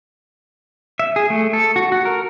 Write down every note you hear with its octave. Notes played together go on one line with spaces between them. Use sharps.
E5
G#4
A3
A4
F#4
F#4
A#4